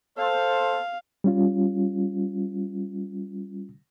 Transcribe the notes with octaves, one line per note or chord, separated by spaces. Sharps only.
A4 C5 F5
G3 C#4 F4